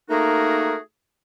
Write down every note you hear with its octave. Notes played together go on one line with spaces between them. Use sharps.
A3 A#3 D#4 F#4 G#4 A#4